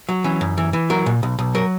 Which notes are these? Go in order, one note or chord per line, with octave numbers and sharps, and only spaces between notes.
F#3
E3 C#4
F#2
E3
E3
F#3 A#4
A#2
B1
B1
F#3 A#4